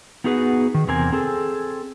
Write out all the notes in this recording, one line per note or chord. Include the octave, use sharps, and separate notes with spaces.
B3 D#4 F#4 G#4 A4 B4
D#3
E2 C3 C4 A#4 G#5
C4 G#4 A4